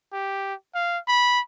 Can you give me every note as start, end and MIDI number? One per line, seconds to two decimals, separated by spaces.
0.13 0.54 67
0.75 0.98 77
1.08 1.40 83